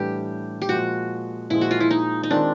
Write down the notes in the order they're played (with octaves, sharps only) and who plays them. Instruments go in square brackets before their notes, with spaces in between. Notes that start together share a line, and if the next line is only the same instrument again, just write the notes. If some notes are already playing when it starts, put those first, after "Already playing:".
Already playing: [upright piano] A2 E3 G3 B3 D4 [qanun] G4
[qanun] G4
[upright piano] A#2 F3 G#3 [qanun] F#4
[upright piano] A#2 F3 G#3 [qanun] E4
[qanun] F#4
F4
E4
D#4
D#4
[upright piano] D#3 G#3 C4 F4 [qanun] D4